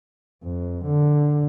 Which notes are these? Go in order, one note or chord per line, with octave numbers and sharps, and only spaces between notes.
F2
D3